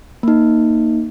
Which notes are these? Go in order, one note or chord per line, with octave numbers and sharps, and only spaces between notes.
A#3 D#4